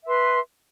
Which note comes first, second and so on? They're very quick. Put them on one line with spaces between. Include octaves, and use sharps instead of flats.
E5 B4 C6